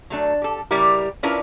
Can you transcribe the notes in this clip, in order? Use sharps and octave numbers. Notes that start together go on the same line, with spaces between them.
F#3 A3 D4
G4 A4
C#3 G3 E4 G4 A#4
C#4 D4 E4 F4 A#4 B4